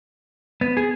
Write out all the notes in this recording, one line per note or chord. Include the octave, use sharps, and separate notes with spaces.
B3
G#4